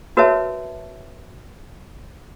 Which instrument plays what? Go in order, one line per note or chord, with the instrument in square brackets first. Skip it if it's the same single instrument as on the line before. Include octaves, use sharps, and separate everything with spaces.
[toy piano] F#4 A#4 B4 C#5 E5 A5